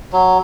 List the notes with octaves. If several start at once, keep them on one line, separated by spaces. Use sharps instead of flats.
F#3